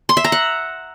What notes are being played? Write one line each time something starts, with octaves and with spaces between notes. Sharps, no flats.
C6
E5
A#5
F#5